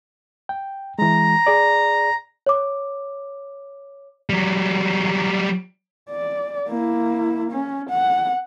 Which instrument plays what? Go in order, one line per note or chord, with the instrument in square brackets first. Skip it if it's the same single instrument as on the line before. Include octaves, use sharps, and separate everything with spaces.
[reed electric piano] G5
[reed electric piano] E3 G#3 [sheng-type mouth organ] A#5
[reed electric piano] G#4 D5
[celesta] C#5 D6
[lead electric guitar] F#3 G3
[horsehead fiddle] D5
A#3 E4
C#4
F#5